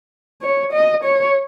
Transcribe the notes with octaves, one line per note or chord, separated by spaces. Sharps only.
C#5
D#5
C#5